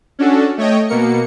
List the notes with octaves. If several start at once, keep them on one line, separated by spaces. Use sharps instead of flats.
C#4 D4 F#4 A4
A3 C#5 D#5 G5
B2 A#3 C#7